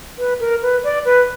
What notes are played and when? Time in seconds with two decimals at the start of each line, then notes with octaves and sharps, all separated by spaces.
0.18 B4
0.40 A#4
0.62 B4
0.84 D5
1.05 B4